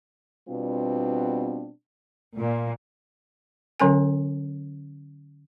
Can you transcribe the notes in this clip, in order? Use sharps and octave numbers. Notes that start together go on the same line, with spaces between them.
B2 G3 B3 C4 D4 F4
A#2
D3 F#3 C#4 A#4 G#5